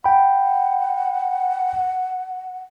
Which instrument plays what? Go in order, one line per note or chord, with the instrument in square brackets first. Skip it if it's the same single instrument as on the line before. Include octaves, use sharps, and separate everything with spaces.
[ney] F#5 [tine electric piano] G5 B5